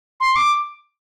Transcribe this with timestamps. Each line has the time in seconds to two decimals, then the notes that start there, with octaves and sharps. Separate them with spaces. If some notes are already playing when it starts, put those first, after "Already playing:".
0.20 C6
0.36 D6